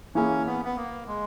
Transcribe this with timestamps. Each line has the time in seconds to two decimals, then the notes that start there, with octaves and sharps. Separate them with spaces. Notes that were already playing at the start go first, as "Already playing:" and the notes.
0.15 E3 A#3 C#4 E4 G#4
0.46 B3
0.65 B3
0.76 A#3
1.07 G#3